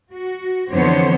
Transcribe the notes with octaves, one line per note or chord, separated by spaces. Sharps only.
F#4
F2 D3 E3 B3 C5 C#5